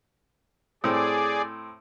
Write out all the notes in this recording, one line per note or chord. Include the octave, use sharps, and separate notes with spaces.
A2 C4 G#4 D5